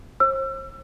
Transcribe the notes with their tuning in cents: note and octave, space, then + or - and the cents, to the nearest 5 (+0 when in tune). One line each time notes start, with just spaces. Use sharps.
C5 +40 E6 +35